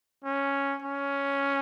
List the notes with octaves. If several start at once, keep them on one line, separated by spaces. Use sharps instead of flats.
C#4
C#4